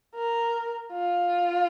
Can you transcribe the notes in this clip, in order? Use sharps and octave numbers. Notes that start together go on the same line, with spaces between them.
A#4
F4